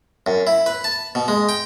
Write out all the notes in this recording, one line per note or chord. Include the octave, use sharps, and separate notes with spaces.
F#2
E4
B4
A5
B2
G#3
G5